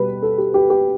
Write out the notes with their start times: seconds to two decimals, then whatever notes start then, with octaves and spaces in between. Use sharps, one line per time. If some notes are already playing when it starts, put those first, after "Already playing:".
Already playing: B2 G3 B4
0.22 A4
0.38 G4
0.54 G4
0.70 G4